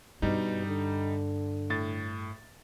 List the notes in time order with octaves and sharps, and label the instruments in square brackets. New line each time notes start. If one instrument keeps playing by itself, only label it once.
[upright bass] G2 [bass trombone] B2 [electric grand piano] G3 D#4
[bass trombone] D3
[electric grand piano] A2 A6